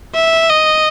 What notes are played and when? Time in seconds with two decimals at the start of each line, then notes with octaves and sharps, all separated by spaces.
0.15 E5
0.49 D#5